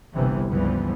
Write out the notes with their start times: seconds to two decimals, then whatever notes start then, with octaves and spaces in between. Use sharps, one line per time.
0.14 G1 C2 C3 E3
0.50 C#2 G2 E3 F3 G3 B3